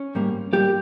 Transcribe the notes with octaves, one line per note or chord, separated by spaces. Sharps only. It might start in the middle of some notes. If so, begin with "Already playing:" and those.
Already playing: C#4
G#2 G3 A#3
G#2 G3 A#3 G4